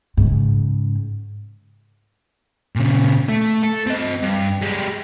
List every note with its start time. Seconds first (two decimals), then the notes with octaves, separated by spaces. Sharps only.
0.17 G#2 C#3
2.76 A#2 C#3
3.29 A3
3.63 A4
3.87 C4 D#5
4.22 G2
4.62 G#3 G4